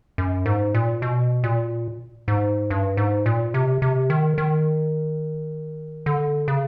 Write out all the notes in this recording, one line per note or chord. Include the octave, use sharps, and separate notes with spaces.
F#2
G#2
A#2
B2
A#2
G#2
G2
G#2
A#2
C3
C3
D#3
D#3
D3
C#3